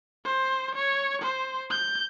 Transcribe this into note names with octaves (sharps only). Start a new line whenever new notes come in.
C5
C#5
C5
G6